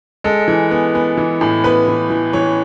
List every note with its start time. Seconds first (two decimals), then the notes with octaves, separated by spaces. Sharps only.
0.24 G#3 A4
0.48 E3
0.71 B3
0.95 B3
1.17 E3
1.41 A2
1.64 B3 B4
1.88 E3
2.10 E3
2.33 E3 C#5